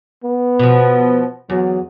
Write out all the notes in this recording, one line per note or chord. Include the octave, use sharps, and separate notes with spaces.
B3
B2 F3
E2 F#3